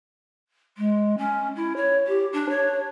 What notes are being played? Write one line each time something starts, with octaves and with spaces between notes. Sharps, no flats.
G#3
C#4
E4
C#5
G4
D4
C#5